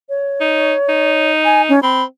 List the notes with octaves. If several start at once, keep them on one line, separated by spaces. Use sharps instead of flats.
C#5
D#4
D#4
G#5
C#4
C4 B5